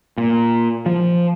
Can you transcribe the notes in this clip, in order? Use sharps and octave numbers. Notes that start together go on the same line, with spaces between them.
A#2
F3